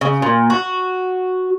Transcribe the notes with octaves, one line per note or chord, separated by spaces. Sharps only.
C#3
A#2
F#4